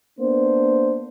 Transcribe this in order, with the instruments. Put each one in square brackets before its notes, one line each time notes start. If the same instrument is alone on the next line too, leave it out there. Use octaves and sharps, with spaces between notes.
[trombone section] A#3 B3 D4 C5